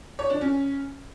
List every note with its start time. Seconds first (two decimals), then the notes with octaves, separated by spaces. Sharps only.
0.19 C#5
0.30 D4
0.41 C#4